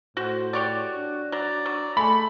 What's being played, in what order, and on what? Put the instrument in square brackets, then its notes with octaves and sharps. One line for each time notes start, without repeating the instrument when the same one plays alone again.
[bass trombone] A2 [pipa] F#4 [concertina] C5
[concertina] F#4 [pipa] G4 C#5 D5
[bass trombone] D4
[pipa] F#3 [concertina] D5 A#5
[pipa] F#3
[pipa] G#3 [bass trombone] A3 [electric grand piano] B5 [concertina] C#6